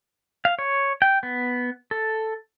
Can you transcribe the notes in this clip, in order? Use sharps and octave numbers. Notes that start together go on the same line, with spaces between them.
F5
C#5
G5
B3
A4